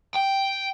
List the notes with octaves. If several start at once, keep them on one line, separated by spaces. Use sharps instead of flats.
G5